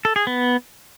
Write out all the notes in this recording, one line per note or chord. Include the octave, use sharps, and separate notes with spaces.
A4
G#4
B3